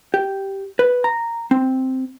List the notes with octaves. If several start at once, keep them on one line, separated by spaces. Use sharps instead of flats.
G4
B4
A#5
C4